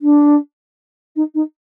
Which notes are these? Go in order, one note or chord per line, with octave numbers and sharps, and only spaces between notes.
D4
D#4
D#4